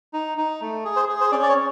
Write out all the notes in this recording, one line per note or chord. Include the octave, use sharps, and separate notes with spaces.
D#4
D#4
A3
G#4
C5
G#4
C5
C#4 D5
D5
C#5